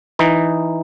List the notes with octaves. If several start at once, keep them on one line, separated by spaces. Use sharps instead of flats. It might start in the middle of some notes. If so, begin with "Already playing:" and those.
E3 D#4